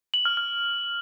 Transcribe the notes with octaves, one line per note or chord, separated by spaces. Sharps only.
F#7
F6
F6